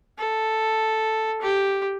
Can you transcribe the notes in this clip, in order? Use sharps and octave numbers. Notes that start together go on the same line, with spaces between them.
A4
G4